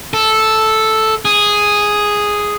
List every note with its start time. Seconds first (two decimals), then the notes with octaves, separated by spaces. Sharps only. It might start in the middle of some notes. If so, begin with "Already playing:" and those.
0.14 A4
1.25 G#4